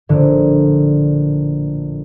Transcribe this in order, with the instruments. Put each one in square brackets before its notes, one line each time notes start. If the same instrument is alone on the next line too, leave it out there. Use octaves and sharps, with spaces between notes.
[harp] A#1 A2 D3